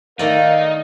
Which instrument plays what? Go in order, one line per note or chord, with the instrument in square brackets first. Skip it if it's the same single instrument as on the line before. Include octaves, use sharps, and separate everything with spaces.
[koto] D#3 A3 D5 [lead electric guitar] D#4 [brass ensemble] A#4 F5